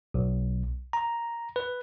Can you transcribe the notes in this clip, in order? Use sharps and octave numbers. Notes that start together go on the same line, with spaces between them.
B1
A#5
B4